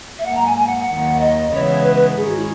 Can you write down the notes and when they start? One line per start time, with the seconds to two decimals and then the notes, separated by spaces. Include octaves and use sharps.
0.18 E5
0.25 G#2 F#3 A#3 F#5
0.35 A#5
0.46 G#5
0.57 G#5
0.67 F#5
0.78 F#5
0.88 D#2 D#3 F#3
1.20 D#5
1.51 C#3 E3 G#3 B3 E4 C#5
1.83 B4
1.95 B4
2.16 G#2 D#3 G#3 C#4 G#4
2.26 F#4
2.37 E4